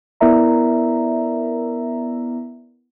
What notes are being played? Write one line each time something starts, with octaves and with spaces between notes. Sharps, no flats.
B3 E4 A#4 D5 E5 A#5